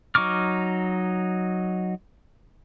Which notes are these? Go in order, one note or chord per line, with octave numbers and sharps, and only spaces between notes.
F#3 D#4 C#6 D6 F6